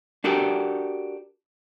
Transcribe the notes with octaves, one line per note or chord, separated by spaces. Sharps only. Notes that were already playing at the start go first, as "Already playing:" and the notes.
D4 F#4 G4 A4 A#4